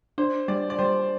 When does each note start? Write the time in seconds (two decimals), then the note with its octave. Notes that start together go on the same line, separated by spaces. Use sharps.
0.18 D4 C5
0.48 G3 D5
0.70 D5
0.79 G3 C5